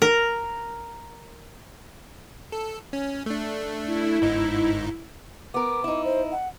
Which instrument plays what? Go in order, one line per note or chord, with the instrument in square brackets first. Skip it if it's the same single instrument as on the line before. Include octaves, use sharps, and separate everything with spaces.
[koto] A#4
[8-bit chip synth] A4
C#4
A3 D4
[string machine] E4
[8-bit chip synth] G1 G#2 D#4
[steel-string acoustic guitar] B3 A#4 [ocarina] D6
[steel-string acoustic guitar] D#4 E4
[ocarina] C5
F#5